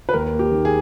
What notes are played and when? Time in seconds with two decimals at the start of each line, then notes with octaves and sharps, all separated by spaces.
0.09 B4
0.14 D#2 A#4
0.33 A#3
0.39 G4
0.52 D#3
0.65 G#4